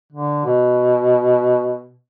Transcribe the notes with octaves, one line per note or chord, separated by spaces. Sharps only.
D3
B2